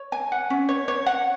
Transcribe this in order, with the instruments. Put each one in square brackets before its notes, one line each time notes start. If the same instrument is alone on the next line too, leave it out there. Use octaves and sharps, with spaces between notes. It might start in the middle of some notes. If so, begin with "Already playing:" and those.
Already playing: [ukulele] C#5
G#5
F#5
C#4
C#5
C#5
F#5